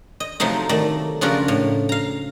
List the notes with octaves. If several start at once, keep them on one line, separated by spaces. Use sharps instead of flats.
D#5
C3 F3 F#3 A3 D#4
D#3 A3 D5
C#3 F3 D4 F#4 A#4
A2
F5 A#5